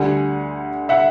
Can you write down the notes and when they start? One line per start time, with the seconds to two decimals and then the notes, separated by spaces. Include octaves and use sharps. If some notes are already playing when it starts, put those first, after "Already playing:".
Already playing: D2 D3 G3 F#5 G#5
0.89 E5 F#5